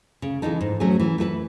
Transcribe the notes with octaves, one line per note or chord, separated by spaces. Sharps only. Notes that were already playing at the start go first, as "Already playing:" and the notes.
C#3
E3 G#3 D#4 A4
G#2
F#3 A3 C#4 G#4
E3
A3 E4 G#4 B4